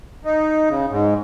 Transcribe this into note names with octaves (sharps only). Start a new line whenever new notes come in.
D#4
C#3
G#2